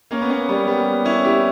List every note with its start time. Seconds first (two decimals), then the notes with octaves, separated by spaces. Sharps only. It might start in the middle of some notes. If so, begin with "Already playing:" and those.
0.11 A#3 C#4
0.21 B3
0.30 A#3 C#4
0.48 G3 B3
0.67 G3 B3
1.05 C#4 E4
1.24 E4 G4